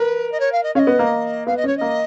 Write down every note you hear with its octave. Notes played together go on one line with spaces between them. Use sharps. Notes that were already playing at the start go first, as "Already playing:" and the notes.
Already playing: A#4 B4
D#5
C#5
F5
D#5
C#4 D#5 F5
B3
A#3
B3 F5
D#5
C#4 C#5
A#3 D#5